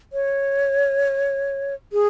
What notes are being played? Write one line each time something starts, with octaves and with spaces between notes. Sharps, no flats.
C#5
G#4